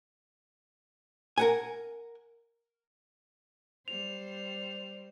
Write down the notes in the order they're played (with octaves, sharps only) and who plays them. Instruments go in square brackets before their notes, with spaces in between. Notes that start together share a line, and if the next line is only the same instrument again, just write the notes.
[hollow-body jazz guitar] A#4 F#5 G#5
[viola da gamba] G3 C5 [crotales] F7